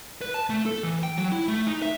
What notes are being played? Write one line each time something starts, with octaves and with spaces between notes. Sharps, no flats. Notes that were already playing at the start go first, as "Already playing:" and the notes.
B4
A5
A3
A4
E3
G5
F#3
E4
A3
D#4
E5